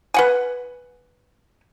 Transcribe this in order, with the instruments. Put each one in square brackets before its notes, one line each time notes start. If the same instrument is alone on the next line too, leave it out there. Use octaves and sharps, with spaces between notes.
[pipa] B4 F#5 G#5